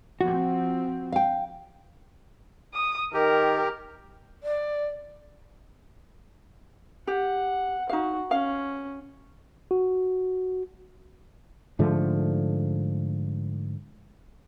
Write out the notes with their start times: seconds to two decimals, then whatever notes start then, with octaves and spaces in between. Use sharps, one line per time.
0.21 F3 C4 F#4
1.12 F5 G5
2.74 D#6
3.14 D#3 G4 A#4
4.43 D5
7.07 G4 F#5
7.89 D#4 F#4 F5
8.31 C#4 F5
9.71 F#4
11.79 G#2 D3 F3 A3